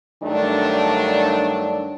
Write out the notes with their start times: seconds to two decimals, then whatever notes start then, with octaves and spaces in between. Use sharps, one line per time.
0.22 G2 D#3 F#3 A3 D4